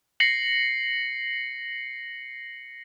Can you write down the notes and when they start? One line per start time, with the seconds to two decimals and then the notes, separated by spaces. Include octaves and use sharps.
0.20 A#6 C7 C#7 F#7